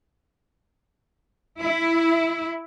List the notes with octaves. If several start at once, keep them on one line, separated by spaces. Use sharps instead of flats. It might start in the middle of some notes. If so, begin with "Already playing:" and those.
E4